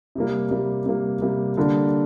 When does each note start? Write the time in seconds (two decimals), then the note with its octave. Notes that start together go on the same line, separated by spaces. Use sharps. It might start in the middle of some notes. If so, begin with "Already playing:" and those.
0.15 C3 G3 A#3
0.51 C3 G3 A#3
0.86 C3 G3 A#3
1.21 C3 G3 A#3
1.57 D3 G3 A#3 D4